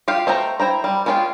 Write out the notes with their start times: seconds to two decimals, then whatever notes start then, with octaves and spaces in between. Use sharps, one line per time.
0.08 F4 G4 F5
0.27 A3 C5 G5 A#5
0.60 E4 C5 G5 A#5
0.84 G3
1.06 G#3 C#4 F4 A4 G5